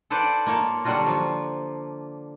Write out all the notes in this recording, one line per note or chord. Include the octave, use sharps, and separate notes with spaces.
A4 B4 C5 D5 F#5 A5
A#3 F4 C#5 A5
D3 F#3 G3 D4 F4 F#4
F3